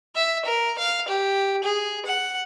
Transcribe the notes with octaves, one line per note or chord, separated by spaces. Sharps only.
E5
A#4
F5
G4
G#4
F#5